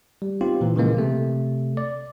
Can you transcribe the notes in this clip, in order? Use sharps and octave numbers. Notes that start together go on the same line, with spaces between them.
G3
B3 C4 D#4 F4 G4
A#2 E3
A#2 C#3 E3 F3 G#3 A#3
C3 A3
D5